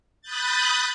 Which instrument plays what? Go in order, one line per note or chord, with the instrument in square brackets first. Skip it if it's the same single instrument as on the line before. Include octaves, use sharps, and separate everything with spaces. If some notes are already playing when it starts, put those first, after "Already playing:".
[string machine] B5 D#6 F#6 G6 A6